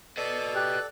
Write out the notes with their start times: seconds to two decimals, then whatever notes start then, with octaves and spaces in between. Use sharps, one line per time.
0.17 A4 B4 D5 D#5
0.54 G4 F#6